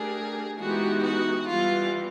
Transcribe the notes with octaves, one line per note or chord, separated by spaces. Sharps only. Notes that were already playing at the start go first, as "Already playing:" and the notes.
Already playing: A3 D4 G4 G#4 A#4
E3 G#3 B3 D#4 F#4 G4
F#4
E3 G3 B3 F4